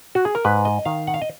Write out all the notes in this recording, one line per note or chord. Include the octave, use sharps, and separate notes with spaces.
F#4
G#4
A#4
G#2 B4
D#5
D#3 F5
F#5
F5
D#5